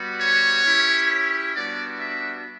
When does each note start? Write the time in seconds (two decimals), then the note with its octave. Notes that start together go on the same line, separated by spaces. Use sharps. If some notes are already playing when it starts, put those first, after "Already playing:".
Already playing: G3 B3 F#4
0.20 C#5
0.65 C#4 E4 G4
1.54 G3 B3 D4 F#4 D5
2.00 E5